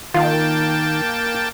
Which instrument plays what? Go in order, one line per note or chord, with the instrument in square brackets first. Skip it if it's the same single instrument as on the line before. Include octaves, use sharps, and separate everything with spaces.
[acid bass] D#3 [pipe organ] A#3 G5 A5 [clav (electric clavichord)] F4 F5